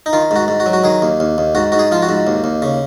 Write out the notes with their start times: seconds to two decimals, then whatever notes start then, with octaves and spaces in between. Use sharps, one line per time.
0.06 D#4
0.13 D#3 F4
0.31 G#2 F#4
0.48 G#2
0.60 F#4
0.66 F#3
0.73 F#4
0.84 D#3 G#4
1.02 D#2
1.20 D#2
1.38 D#2
1.55 G#2 F#4
1.72 G#2 F#4
1.79 G#4
1.92 F3 F4
2.03 F#4
2.09 G#2
2.27 D#2
2.44 D#2
2.62 C#3